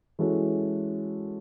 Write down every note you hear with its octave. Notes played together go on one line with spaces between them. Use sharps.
E3 G#3 C#4 F#4 A4